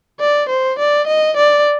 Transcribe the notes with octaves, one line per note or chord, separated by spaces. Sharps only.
D5
C5
D5
D#5
D5